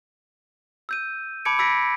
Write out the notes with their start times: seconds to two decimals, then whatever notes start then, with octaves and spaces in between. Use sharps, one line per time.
0.89 E6 G6 D#7
1.45 A5 B5 D6 G#6 C#7 D7
1.59 B5 E6 G#6 A#6 B6 D7